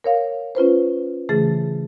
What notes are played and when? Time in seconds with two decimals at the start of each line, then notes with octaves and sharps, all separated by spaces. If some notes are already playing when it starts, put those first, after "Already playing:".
0.04 A#4 C#5 F5
0.55 C#4 F4 B4 C5
1.29 C#3 E3 A3 G#4 A6